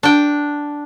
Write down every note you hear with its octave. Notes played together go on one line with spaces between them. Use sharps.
D4 G5